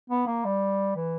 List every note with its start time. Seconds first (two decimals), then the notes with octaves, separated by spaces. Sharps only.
0.10 B3
0.27 A#3
0.45 G3
0.96 E3